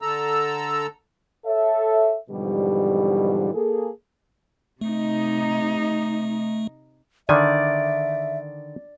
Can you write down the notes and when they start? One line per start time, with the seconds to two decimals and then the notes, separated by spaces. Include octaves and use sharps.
0.02 D3 A4 A#5 E6
1.46 A4 C#5 E5
2.31 G#2 B2 D3 E3 F3 G3
3.54 A#3 G#4 A4
4.81 C3 A3 D#4
7.29 D3 D#3 D5 E5 G#5